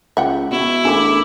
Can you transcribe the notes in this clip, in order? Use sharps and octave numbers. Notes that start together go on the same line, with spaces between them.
C#2 E5 F#5 G5
B2 E4
A1 D#3 G3 D4 G#4 A4 D6